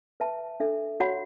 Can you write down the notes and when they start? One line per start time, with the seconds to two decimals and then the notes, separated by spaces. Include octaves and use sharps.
0.20 B4 E5 A5
0.60 D4 A4 E5
1.00 F#4 C#5 F#5 B5